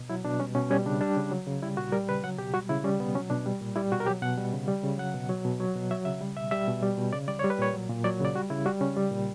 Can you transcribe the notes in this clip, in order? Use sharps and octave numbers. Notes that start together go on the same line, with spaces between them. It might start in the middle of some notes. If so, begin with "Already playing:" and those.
Already playing: B2
F#3 E4
B2 D4
G3 C#4
B2 C#4
G3 C#4
C#3 D4
G3 D4
C#3
F#3
C#3
G3 E4
A#2 F#4
G3 A#4
C#3 B4
F#3 F#5
B2 G4
G3 F#4
C#3 E4
G3 C#4
B2 B3
F#3 C#4
B2 D4
G3
A#2
G3 E4
B2 F#4
A#4
F#3 G4
B2 F#5
G3
C#3
G3
C#3
F#3 F#5
B2
F#3
B2
F#3
B2
F#3 E5
C#3 E5
G3
B2 E5
G3 E5
B2
G3
B2
C#3 D5
G3 D5
G3 C#5
B4
A#2 C#5
F#3
A#2
F#3 D5
C#3 D5
G3 F#4
C#3 E4
G3 F#4
C#3 C#4
G3
A#2